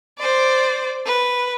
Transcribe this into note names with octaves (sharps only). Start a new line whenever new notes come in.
C5 D5
B4